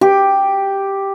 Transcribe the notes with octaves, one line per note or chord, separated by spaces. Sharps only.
G4